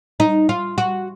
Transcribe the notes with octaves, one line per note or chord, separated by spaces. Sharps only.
D#4
F4
F#4